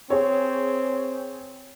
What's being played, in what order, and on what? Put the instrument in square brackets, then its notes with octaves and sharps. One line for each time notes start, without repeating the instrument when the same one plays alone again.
[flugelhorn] C4 [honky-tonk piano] G#4 C#5